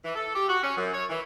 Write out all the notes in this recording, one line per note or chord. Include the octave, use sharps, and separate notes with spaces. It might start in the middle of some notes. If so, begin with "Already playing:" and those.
E3
A4
G4
F#4
C#4
F#2
C#5
E3